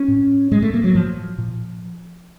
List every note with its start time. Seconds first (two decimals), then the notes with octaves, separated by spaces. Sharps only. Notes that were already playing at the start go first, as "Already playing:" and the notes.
Already playing: C#4
0.08 A2
0.51 A2 G#3
0.63 A3
0.74 A#3
0.84 F#3
0.95 A2 F3
1.38 A#2